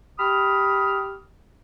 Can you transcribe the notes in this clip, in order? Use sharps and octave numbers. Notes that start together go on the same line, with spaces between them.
G4 B5 D#6 F6